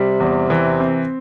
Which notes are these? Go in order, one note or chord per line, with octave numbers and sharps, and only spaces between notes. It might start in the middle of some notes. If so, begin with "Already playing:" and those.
Already playing: C3 G3
E2
E3
C4